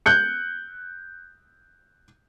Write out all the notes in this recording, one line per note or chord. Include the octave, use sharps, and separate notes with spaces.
F#6 G6 C#7